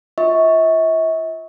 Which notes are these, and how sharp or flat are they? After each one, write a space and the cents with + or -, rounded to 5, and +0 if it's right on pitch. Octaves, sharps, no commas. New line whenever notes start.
F4 +0 E5 -45 C#6 +0